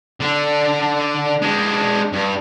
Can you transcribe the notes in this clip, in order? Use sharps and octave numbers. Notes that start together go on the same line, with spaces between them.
D3 D4
G#3 D4
G2